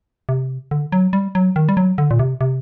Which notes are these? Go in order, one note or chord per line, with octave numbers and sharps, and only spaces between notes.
C3
D3
F#3
G3
F#3
D#3
G3
F#3
D3
A#2
C3
C3